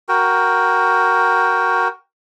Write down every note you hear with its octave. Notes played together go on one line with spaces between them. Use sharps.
F#4 A#4 G5